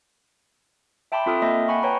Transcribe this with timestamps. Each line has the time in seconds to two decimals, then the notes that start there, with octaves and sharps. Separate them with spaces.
1.12 E5 G5 A5 B5 C6 D6
1.26 C4 F4 A4 D#6 F6
1.42 A#3 D#5 E5 G5 A5 C6
1.68 F#5 G#5 B5 C#6
1.83 B4 C#5 G5 A#5 C#6